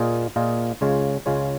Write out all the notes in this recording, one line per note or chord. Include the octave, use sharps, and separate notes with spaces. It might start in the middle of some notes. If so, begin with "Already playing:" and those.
Already playing: A#2 A#3 F4 G#4 D#5
A#2 A#3 F4 G#4 D#5
C#2 C#3 G#3 F4 C#5
C#2 C#3 G#3 F4 C#5